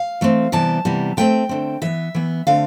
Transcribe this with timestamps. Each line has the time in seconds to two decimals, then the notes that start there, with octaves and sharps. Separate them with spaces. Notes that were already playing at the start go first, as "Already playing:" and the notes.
Already playing: F5
0.21 E3 A3 C4
0.52 C3 E3 G3 B3 A5
0.85 C3 E3 G3 B3
1.17 D3 A3 C4 G5
1.49 D3 A3 C4
1.82 E3 B3 E5
2.15 E3 B3
2.47 D3 A3 C4 F5